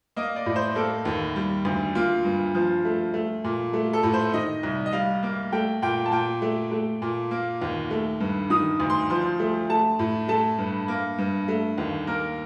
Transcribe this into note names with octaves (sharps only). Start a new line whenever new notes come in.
A#3 D#5
D5
A2
C5
A#3 A4
D#2
G3
D2
A#3 F4
G2
F3
A3
A3
A#2
A3
A4
A2
C5
D#3 D#5
C2
D#5
G3 F5
A#3
A3 G5
A#2 G5
A5
A#2 G5
A3
A3
A#2
A#3
D#2
A3
G2
D#3 D#6
D2
C6
F3 C6
A3
A3 A5
A2
A3 A5
G2
A#3
G2
A3
D#2
A#3 A#4